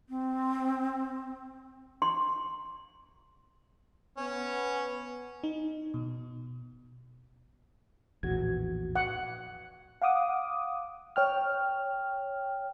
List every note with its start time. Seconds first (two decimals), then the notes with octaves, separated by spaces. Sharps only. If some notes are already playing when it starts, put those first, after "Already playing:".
0.09 C4
2.02 C6
4.18 B3 C#4
5.44 D#4
5.94 B2
8.23 A#1 E2 A2 F#4 G#6
8.96 F#5
10.02 F5 F#5 D6 D#6
11.16 C#5 G5 F6